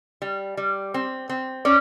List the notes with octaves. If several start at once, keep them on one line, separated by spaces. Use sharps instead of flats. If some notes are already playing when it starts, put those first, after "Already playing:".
G3
G3
C4
C4
C#4 D5